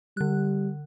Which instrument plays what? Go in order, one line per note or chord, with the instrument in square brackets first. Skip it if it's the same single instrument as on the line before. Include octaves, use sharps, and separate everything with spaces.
[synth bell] D3 F#6 [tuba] G3